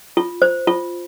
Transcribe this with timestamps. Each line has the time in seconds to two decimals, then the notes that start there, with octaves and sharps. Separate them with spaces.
0.17 F4
0.42 C5
0.67 F4